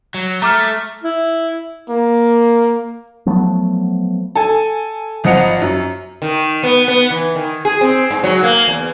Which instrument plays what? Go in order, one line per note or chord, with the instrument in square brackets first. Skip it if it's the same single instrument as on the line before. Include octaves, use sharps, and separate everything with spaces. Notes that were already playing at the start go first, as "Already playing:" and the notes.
[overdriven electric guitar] F#3
[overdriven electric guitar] A3 [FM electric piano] A#5 D6 F6
[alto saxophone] E4
[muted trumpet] A#3
[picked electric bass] F3 F#3 A3 B3
[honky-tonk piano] A4 G#5
G#1 F3 D#5 F#5 C#7 F7
F#2
[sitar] D#3
B3
B3
E3
D#3
G#4
C4
G#2
F#3
A#3
E2